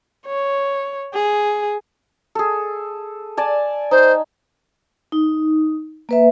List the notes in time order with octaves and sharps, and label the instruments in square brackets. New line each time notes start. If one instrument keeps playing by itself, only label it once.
[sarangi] C#5
G#4
[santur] G#4 A4
D5 G#5 A5
[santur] D#4 [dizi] C5
[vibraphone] D#4
A#3 B4 E5